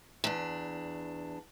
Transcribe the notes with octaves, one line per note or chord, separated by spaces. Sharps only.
E2 D4